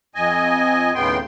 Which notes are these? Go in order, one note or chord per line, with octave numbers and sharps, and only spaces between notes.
F2 D#5 G#5
D#2 A2 C#3 B3 G5 C6